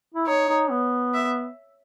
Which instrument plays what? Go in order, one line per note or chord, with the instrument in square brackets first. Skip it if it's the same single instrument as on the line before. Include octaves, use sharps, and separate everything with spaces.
[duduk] E4
[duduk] D#4 [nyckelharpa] C#5
[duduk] D#4
B3
[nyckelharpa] E5